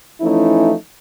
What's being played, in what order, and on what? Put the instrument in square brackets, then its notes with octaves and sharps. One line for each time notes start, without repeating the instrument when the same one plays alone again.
[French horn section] E3 F3 A3 C#4 D#4 E4